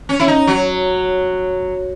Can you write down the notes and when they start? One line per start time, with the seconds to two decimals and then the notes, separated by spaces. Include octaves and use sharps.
0.09 C#4
0.20 E4
0.28 D#4
0.47 F#3